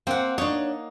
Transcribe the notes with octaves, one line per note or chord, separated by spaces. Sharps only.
A#3 C4 F#5
D4 D#4 C#5